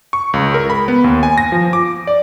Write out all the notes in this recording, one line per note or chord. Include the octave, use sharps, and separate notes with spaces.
C#6
C#2
A#4
B5
B3
D#2
G#5
A#6
F3
D6
D5